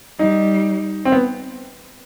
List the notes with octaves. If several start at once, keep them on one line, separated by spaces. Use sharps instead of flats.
G3 D#4
C4
B3